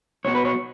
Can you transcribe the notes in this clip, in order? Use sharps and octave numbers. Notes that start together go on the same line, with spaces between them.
B1 B2 C#5
B4
C#5